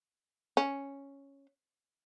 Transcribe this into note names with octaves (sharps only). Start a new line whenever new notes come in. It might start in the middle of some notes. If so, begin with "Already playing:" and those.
C#4